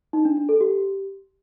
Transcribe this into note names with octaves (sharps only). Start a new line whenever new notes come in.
D#4
D4
D4
A4
G4